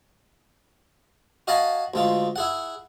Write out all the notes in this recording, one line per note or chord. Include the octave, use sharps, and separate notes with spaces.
F#4 D#5 F5 G#5 A5 B5
D2 G#3 F4
E4 G#4 F#5